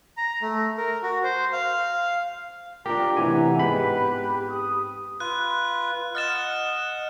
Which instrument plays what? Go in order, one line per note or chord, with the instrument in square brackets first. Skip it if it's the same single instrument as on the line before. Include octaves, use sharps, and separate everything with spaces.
[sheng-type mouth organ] A#5
A3
A#4
F#4
C5
F5
[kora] D4 A#4 [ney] F4 [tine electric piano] G4 [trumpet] A#5
[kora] A2 B3 [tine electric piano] C3 E3 G#5 [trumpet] F#5 [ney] A#5
[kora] G#2 B3 C4 [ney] G4 [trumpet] B4 [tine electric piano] B5
[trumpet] D#6
[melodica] F4 B4 [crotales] F#6
[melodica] D#5 F#5 [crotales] F6 A6 E7